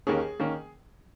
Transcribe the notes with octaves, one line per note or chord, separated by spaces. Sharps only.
D#2 D#3 A#3 C#4 G#4
D#3 A#3 C#4